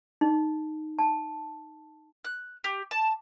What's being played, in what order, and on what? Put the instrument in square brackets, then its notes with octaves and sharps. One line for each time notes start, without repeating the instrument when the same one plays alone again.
[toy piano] D#4
A5
[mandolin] F#6
G4
A5